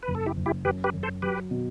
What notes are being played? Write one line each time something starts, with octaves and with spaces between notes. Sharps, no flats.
B4
F#1
A4
E4 G4
F#1
E4 G4
F#2 G4 B4
G4 B4
F#2
A4 C5
F#3 G4 B4
B2